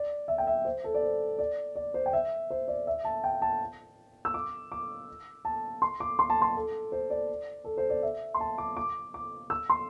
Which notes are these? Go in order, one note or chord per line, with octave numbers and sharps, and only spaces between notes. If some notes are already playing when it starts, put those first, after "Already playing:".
Already playing: D5
E5
G5
E5
C5
A4
D5
C5
D5
D5
C5
G5
E5
C5
D5
E5
A5
G5
A5
E6
D6
D6
A5
C6
D6
C6
A5
C6
A4
C5
D5
A4
C5
D5
E5
C6
A5
D6
D6
D6
E6
C6